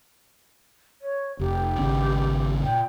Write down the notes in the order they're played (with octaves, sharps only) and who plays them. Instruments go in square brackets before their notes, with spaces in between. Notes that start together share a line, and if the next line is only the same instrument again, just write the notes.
[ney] C#5
[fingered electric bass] F1 [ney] G4
[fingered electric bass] G#1 C#3 C#4
[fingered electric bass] A#2 [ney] G5